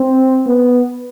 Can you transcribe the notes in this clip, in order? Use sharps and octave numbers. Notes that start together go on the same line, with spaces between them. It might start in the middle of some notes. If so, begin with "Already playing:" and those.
Already playing: C4
B3